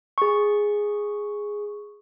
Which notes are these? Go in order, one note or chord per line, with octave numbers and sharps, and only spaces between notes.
G#4 C#6